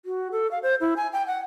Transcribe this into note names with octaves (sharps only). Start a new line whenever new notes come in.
F#4
A4
F5
C5
E4
G#5
G5
F#5